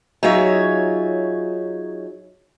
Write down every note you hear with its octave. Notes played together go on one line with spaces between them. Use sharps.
F#3 D#4 F4 G#4 C#5 E5